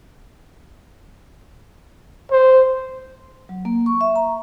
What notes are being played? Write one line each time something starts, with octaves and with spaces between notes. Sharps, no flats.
C5
F#3
A#3
C#6
E5
A#5